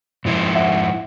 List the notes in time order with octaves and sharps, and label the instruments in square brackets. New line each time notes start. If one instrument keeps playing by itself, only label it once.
[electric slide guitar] G#2 F3 E4
[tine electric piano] E5 F#5